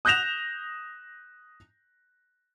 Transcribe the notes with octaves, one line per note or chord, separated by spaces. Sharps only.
D#6 F#6 G6 A#6 E7 F7